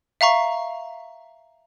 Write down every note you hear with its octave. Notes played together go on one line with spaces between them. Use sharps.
E5 F5 A#5 C#6